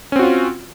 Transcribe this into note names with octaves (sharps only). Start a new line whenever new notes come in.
C4 C#4 F4 F#4